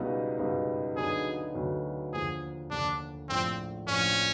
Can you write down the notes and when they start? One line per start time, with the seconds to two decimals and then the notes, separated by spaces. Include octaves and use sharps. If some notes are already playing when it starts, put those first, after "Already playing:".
Already playing: C#2 B2 G3 B3 D#4
0.38 C#2 B2 G3 B3 D#4
0.96 D2 D3 F#3 B3 D#4 G#4
1.54 D2 D3 F#3 B3 D#4
2.12 D#2 D3 F3 G#4
2.70 D#2 D3 F3 D4
3.29 A#1 A2 F3 C4
3.86 A#1 A2 F3 C#4